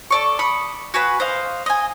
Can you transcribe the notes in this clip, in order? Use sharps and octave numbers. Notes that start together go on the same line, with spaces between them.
A4 D5 C#6
B5 C#6 D#6
F#4 G#4 B4 B5
C5 D#5 F5
D#5 G#5